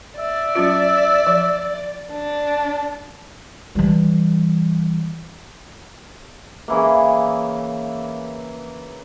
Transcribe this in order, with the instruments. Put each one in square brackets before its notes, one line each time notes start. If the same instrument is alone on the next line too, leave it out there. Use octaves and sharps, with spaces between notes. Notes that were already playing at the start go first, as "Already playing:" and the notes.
[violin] D5 [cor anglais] E5
[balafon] F#3 C#4 F4
F3
[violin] D4
[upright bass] E3 G3
[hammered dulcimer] C#3 E3 A#3